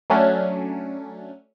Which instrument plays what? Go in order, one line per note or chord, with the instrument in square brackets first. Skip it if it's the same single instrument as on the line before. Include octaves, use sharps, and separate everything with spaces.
[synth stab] F#3 A3 C#4 D4